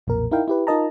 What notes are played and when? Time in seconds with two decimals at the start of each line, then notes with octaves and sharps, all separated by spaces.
0.07 B1 F2 A#2 A#4
0.31 D#4 E4 A#4 F5 G5
0.48 E4 G4 B4
0.67 D#4 F4 A#4 D#5 A5 A#5